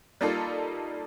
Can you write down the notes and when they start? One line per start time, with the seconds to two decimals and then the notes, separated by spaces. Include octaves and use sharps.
0.21 G3 A#3 D#4 F4 A4